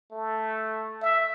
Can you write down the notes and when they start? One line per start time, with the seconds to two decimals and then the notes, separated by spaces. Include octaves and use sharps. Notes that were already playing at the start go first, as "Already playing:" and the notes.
0.11 A3
1.02 E5